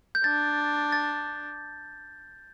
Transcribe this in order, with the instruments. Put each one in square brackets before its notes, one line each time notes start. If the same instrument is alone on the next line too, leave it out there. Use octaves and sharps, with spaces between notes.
[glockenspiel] G6
[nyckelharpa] D4 [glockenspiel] A6
[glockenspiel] A6